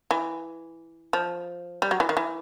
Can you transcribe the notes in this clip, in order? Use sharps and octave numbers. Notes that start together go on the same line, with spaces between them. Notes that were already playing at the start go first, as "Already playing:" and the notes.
E3
F3
G3
F#3
E3
D#3
E3